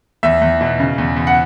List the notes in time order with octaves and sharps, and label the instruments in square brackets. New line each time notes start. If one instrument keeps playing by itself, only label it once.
[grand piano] E2 E5
E2
B2
C#3
E2
E2
F#5